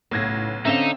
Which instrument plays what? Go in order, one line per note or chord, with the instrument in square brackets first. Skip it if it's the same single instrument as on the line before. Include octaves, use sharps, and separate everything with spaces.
[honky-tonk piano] B1 G#6 A#6 [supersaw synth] A2 [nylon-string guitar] C#3 B3
[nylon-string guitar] D3 C#4 F5 [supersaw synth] C4 E6 [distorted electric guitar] D#4 [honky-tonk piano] E5 E7